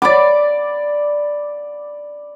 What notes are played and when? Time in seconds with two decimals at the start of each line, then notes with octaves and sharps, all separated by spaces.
0.02 D5 B5 D6